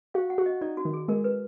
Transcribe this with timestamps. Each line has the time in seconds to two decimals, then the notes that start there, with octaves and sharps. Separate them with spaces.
0.14 F#4 F5
0.30 F#5
0.38 F#4
0.46 D#5
0.61 D#4 D5
0.77 F#4
0.85 D#3
0.93 G#4
1.08 G#3 A#4
1.24 B4